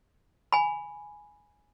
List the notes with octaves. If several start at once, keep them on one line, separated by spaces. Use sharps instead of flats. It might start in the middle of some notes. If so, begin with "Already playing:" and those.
G#5 B5